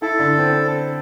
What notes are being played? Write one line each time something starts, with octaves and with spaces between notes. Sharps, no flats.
E4 A4
D3
C4